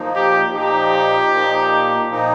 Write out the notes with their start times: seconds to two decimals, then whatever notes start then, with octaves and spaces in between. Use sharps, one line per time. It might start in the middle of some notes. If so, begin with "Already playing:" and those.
Already playing: A#2 F3 A#3 D#4
0.16 G4
0.54 A#2 F3 A#3 D#4 G4
1.31 A#2 F3 A#3 D#4
2.09 A#2 F3 A#3 D#4